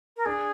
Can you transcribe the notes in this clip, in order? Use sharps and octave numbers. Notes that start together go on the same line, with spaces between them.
A#4
D4 G#4